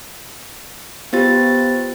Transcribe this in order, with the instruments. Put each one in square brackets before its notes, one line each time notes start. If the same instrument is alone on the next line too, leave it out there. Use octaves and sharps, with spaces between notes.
[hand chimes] B3 F4 G4 C5 A6